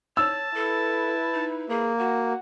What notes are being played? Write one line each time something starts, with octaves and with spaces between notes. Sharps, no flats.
C#5 A5 E6
E4 A4 B4
D#4
A#3 G#4
F#4 F#5